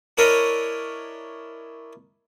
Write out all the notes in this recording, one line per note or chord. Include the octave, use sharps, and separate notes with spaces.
D4 E4 A#4 C#5 D#5